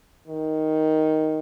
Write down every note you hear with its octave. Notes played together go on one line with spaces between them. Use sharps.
D#3